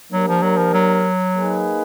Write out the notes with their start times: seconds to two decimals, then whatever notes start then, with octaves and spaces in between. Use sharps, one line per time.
0.12 F#3 A#3 D4 G4 A#4
0.28 F3
0.42 F#3
0.57 F3
0.73 F#3
1.34 A#3 D#4 G#4 B4